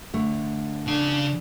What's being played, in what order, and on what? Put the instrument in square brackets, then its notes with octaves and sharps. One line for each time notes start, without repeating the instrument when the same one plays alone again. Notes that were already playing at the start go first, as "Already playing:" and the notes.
[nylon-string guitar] D3 A3
[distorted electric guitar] C#3 F5 [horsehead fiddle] D4